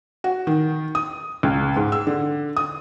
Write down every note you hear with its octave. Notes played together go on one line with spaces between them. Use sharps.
F#4
D#3
D#6
C#2
G#2
E6
D3
D#6